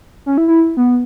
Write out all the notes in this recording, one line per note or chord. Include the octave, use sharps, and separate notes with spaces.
C#4
E4
E4
B3